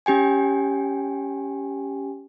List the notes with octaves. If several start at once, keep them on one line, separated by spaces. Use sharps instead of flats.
C#4 G4 G5 G#5